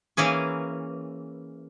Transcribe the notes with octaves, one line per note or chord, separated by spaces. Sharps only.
E3 A#3 C#4 G#4